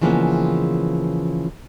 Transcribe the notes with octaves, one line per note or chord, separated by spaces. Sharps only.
C#3 E3 F3 G#3 A#3 B3